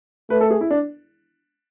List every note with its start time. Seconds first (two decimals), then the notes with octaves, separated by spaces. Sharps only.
0.30 A3 B4
0.41 A4
0.50 G#4
0.61 E4
0.70 D4